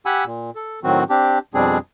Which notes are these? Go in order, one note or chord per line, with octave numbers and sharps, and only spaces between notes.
G4 F#5 G#5 B5 E6
A#2
A4
A2 D#3 F#3 C4 F#4
C4 D4 G4
F2 B2 G3 C4 D4 G#4